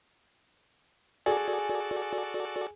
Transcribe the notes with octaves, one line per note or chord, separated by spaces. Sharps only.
F#4 G#4 A4 D5